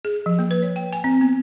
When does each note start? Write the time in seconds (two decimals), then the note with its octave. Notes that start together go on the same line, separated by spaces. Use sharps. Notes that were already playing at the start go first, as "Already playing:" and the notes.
0.05 G#4
0.26 F3
0.39 A#3
0.51 B4
0.63 C#5
0.76 G5
0.93 G#5
1.04 C4
1.21 B3